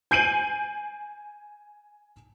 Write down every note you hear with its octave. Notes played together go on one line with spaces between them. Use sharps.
G#5 G6 C7 D7 D#7 F#7